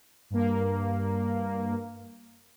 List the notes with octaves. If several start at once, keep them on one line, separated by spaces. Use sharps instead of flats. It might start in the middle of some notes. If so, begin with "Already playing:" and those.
G2 A#3